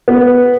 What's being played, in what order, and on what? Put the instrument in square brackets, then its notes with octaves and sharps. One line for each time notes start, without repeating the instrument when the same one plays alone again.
[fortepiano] B3